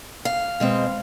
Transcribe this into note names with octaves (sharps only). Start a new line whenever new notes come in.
F5
B2 G#3 C4